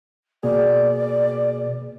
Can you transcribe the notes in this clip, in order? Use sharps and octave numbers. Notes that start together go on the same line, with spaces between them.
B2 A#3 G#4 D5